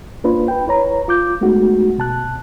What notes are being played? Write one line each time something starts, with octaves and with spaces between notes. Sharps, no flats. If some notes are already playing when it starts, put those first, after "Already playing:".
A#3 D4 F4 B4 C5
B4 G5
E4 B4 C#5 A#5
F4 D6 G6
G#3 A3 B3 D#4 F#4
B2 A5 F#6